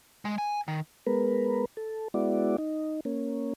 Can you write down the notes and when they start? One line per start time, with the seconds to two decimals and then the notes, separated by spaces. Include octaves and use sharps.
0.25 G#3
0.38 G#5
0.68 D#3
1.07 G#3 B3 A#4 B4
1.77 A4
2.14 G#3 B3 E4 F#4 D5
2.58 D#4
3.05 A#3 C#4